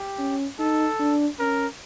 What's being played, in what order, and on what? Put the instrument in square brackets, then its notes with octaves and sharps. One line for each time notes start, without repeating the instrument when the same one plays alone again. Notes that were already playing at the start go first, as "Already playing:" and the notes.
Already playing: [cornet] G4
[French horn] C#4
[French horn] D#4 [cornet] A4
[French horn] D4
[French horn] C#4 [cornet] A#4